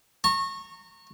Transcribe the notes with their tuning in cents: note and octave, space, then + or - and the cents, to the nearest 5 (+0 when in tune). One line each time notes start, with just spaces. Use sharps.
A#5 -30 C#6 -20